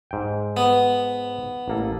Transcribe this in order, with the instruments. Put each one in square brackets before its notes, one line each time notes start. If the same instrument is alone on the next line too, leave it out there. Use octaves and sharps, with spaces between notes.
[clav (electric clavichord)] G#2 G5
[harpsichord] B3
[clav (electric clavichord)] A1 A#3 A4